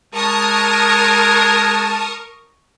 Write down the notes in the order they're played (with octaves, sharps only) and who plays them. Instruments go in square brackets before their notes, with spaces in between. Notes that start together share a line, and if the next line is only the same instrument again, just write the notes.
[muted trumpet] G#3 [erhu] A#4 [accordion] A5 [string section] C#6 D#6 F6